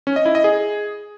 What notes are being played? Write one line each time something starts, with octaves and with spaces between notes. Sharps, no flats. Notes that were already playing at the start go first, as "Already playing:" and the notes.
C#4
D#5
E4
D#5
G#4